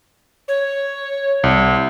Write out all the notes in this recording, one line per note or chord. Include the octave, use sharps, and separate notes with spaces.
C#5
C2